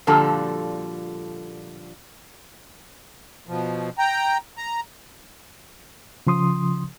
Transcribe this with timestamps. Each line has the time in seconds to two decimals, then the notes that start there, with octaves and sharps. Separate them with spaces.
0.07 A#2 D3 F3 G3 F#4 A4
3.48 B2 F3
3.98 G5 A#5
4.58 A#5
6.27 C#3 F3 C6 D#6